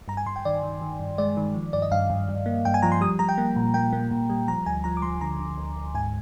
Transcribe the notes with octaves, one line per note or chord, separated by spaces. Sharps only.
G2 A#5
G#5
G2 C6
G5
D#3 D5
D#3
D#3
G2
G#3 D5
D#3
F3
G2 D5
D#5
G2 F5
G2
G2
A#3
G2 G5
G#5
F3 A#5
C6
G3 D#6
G3 A#5
G5
A#3
A#2
A#3 G5
A#3
A#2
G3
F3 A#5
D2 G#5
F3 A#5
D6
F3 C6
D3 A#5
D3
D2
D2
G#2 G#5